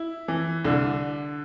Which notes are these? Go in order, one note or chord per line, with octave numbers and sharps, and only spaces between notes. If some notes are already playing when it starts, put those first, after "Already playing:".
Already playing: E4
E3
C2 D3 D4